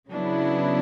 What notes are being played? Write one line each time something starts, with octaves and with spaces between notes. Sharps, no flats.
C#3 F#3 B3 D4 E4